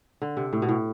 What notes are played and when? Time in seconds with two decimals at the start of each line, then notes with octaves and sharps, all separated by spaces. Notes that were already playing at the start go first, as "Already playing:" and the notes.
0.22 D3
0.37 C3
0.53 A2
0.62 B2
0.69 A2